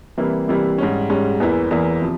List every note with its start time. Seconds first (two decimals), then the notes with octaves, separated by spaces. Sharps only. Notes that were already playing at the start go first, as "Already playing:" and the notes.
0.18 C3 E3 G3 A#3 E4
0.48 C3 E3 G3 A#3 E4
0.78 G#2 G3 C#4
1.10 G#2 G3 C#4
1.40 E2 E3 A#3 E4
1.71 E2 E3 A#3 E4
2.02 C3 F3